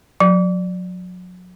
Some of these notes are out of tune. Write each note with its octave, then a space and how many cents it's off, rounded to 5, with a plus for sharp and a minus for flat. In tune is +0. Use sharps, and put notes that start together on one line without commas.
F#3 -35